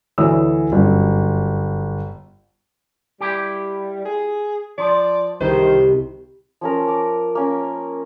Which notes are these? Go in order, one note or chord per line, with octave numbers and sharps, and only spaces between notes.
D2 E3 C#5 D#6 E6
G1 F#2
G3 E4 G4
G#4
F3 D5
C2 D#3 C5
F3 C#4 A#4
D6
A#3 C#4